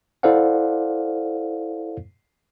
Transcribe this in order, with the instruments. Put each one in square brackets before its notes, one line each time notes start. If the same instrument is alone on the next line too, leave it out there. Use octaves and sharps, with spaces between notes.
[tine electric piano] E4 A4 C5 D5 F5 F#5